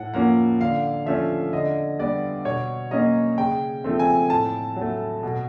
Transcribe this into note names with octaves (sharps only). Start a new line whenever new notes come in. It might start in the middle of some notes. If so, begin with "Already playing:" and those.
Already playing: A2 F#5
F3 A#3 C#4 F#5
D3 F5
F3 A3 C#4 E5
D3 D#5
G3 B3 D5
B2 C#5
F#3 A#3 C#4 D#5
C#3 G5
F3 A3 C4
G#5
A2 A5
F#3
A3
B2